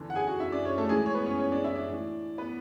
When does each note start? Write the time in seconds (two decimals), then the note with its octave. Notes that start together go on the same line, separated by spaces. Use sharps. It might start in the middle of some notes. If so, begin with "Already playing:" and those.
Already playing: E2 D3
0.10 F#5
0.15 G#4 G#5
0.27 F#4 F#5
0.40 E4 E5
0.52 D4 D5
0.65 C#4 C#5
0.78 A3 A4
0.89 A2 E3 G#3 G#4
1.06 C#5
1.14 B3 B4
1.26 C#4 C#5
1.39 C#4 C#5
1.52 D4 D5
1.64 E4 E5
1.76 D4 D5
1.88 A2 E3
2.38 B3 B4